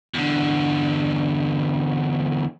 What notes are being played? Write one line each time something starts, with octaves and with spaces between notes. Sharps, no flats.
E2 D3